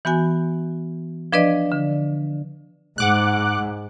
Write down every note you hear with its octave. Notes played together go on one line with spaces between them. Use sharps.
E3 B3 F#4 G#5
F3 D4 B4 D5 D#5
D3
G#2 F#5 D6 F#6